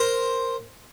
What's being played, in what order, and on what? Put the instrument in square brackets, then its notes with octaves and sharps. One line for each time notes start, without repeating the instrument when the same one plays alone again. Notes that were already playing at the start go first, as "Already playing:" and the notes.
Already playing: [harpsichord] A#4 C5